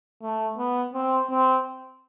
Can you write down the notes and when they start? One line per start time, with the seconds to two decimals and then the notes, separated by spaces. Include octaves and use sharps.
0.22 A3
0.58 B3
0.94 C4
1.30 C4